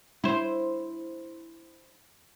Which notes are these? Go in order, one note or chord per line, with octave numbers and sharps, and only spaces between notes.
E4 C5